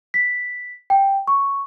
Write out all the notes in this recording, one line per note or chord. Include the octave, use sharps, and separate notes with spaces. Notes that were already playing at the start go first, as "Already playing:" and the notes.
B6
G5
C#6